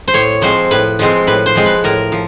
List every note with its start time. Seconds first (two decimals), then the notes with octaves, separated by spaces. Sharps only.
0.08 C5
0.14 A2 C#5
0.41 F3 G#3 C4 C5
0.71 A2 B4
0.99 F3 G#3 C4
1.27 A2 B4
1.46 C5
1.55 F3 G#3 C4
1.66 B4
1.84 A2 A#4
2.12 F3